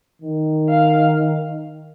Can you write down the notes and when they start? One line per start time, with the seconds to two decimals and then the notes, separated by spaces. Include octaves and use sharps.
0.22 D#3
0.69 F5